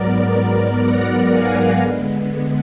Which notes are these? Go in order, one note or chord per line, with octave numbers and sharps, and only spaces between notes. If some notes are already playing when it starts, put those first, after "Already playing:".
Already playing: G#2 F#3 B3 A#4 D5
F#5 A#5
F5 G#5
D3 G#3 B3